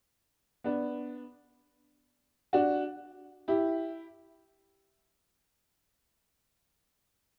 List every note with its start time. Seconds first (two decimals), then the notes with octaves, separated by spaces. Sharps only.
0.64 B3 D4
2.53 D4 F#4
3.48 E4 G4